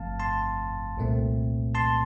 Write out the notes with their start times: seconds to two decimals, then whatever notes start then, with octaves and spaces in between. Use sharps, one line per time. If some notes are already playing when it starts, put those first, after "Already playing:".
Already playing: G1 G2 F3 A3 C4 F5 A5
0.19 A5 C6
0.97 C2 A#2 A3 C4
1.75 A5 C6